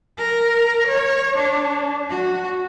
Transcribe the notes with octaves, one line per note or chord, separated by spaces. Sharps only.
A#4
C#5
D4
F#4